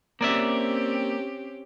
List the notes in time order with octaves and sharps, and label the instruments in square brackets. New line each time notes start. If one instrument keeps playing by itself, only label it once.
[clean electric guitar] A#3 D5 E5 [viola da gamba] C4 C#4 G4